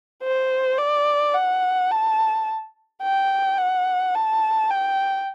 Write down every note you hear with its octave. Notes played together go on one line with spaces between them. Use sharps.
C5
D5
F#5
A5
G5
F#5
A5
G5